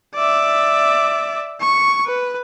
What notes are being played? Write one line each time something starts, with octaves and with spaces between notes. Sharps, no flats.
D5 E5
C#6
B4